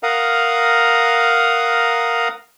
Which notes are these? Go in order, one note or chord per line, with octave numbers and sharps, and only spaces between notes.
A#4 F5 F#5 A#5 D#6